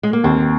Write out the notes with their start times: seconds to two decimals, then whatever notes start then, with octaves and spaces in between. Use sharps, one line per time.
0.03 G#3
0.13 A#3
0.24 D#2 C4